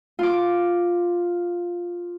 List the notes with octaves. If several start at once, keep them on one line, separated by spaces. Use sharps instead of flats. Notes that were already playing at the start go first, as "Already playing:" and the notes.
F4 D6